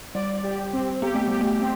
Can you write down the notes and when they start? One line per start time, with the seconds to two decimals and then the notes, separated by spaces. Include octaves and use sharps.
0.15 G3 D5
0.43 G4
0.73 C4
1.02 B3 G4
1.15 A3
1.28 G3 G4
1.41 A3
1.60 C4